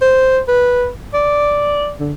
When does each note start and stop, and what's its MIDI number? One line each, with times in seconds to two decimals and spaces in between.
0.01 0.40 72
0.48 0.89 71
1.14 1.93 74
2.00 2.12 50